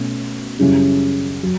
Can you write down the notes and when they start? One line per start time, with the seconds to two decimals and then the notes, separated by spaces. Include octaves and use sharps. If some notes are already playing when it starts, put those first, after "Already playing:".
Already playing: B2 A3 C#4
0.59 F#2 C#3 G3 C#4 E4
1.43 F#3